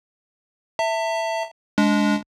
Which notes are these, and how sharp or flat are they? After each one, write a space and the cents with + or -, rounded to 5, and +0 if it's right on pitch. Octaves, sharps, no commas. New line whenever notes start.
E5 +0 A5 +40
G#3 +0 D4 -25